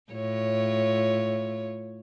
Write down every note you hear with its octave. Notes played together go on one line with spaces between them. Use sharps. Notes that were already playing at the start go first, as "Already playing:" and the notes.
A2 F4 C#5